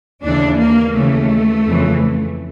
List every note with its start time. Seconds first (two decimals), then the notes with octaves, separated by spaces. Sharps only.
0.23 D#2 C#3 E3 D4
0.59 A#3
0.95 D#2 C#3 E3 A3
1.66 F2 C#3 E3